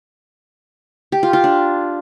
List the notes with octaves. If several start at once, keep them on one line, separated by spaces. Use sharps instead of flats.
G4
F4
F4
D4